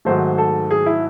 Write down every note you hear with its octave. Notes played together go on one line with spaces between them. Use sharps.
G#2 D#3 F#3 A3 C5
A4
G#4
E4